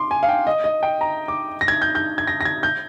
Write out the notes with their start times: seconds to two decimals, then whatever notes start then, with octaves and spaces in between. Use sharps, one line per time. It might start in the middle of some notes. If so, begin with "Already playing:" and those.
Already playing: C6 D6
0.11 G#5
0.23 F5
0.29 G5
0.47 D#5
0.64 D#5
0.83 G5
1.01 A#5
1.28 D6
1.61 A#6
1.68 G#6
1.82 G6
1.95 G6
2.18 G#6
2.27 A#6
2.41 A#6
2.45 G#6
2.63 G6